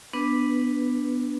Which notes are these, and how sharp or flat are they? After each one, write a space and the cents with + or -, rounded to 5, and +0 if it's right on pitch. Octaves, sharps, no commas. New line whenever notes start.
B3 +0 D4 +0 B4 +0